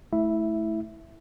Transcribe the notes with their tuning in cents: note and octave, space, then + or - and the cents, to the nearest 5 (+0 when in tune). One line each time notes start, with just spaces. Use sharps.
A3 -20 E4 -15 E5 +5